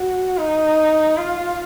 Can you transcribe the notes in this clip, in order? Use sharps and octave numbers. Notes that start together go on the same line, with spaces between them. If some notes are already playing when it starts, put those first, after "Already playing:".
Already playing: F#4
D#4
F4